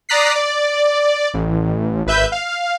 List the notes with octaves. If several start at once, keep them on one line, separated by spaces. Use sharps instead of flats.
D5 A#5 D#6 F#6 B6 C7
D5
A1
G#1 B4 E5 G6
F5